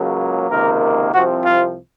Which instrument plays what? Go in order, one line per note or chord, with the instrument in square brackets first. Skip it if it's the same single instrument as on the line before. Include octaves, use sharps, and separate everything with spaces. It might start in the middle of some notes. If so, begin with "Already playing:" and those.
Already playing: [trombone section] C#2 C#3 F#3 A#3
C#2 C3 D#3 A#3 A#4
C2 C3 F3 C4 F#4
F4